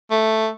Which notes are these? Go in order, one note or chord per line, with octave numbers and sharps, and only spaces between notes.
A3